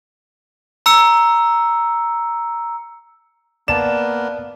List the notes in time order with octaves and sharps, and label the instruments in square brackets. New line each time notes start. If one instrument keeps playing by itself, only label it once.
[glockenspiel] A#5 E6 C#7
[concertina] A#3 B3 [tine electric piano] D5 A5 [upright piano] E7